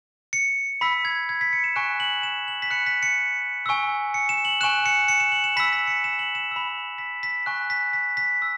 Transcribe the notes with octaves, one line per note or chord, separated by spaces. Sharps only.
C#7
B5 E6 B6
G#6
G#6
B6
C#7
E7
G#5 C#6 F#6 E7
F#7
E7
F#7
B6
B5 F#6 C#7
B6
C#7
G#5 C#6 E6
C#7
E7
F#7
G#5 C#6 F#6 E7
C#7
C#7
E7
F#7
E7
B5 E6 B6
B6
C#7
E7
F#7
E7
B5 E6
B6
B6
G#5 C#6 F#6
B6
B6
B6
E6